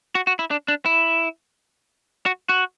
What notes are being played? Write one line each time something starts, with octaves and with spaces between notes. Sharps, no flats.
F#4
F#4
E4
D4
D4
E4
F#4
F#4